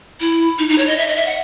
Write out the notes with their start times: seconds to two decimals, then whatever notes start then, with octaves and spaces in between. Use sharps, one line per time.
0.20 E4
0.58 D#4
0.69 D#4
0.78 C#5
0.88 D#5
0.97 E5
1.07 D#5
1.17 E5
1.26 F#5